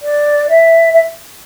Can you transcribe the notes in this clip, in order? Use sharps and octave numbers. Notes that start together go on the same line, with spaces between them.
D5
E5
E5